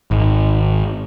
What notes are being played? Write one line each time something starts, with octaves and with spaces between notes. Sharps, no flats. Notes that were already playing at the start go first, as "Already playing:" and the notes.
G#1